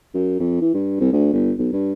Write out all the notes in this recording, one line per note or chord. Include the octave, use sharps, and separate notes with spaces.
F#2
F2
E3
G2
C2
D2
G1
B1
G2